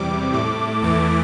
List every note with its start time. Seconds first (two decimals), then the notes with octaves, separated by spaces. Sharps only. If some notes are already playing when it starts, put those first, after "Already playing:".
Already playing: E2 C3 G3 D6
0.33 A2 A3 D6
0.82 E2 E3 A3 D6